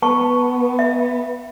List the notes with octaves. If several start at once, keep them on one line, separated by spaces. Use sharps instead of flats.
B3 B4 A5 C#6
E5